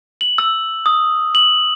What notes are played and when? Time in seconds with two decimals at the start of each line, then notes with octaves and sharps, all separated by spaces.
0.21 F#7
0.38 E6
0.86 D#6
1.35 F#7